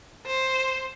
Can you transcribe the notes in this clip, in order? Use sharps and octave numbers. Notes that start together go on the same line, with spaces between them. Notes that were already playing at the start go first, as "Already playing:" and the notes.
C5